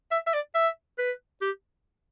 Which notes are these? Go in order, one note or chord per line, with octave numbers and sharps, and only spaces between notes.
E5
E5
D5
E5
B4
G4